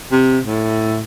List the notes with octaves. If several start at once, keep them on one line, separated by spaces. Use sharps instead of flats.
C3
A2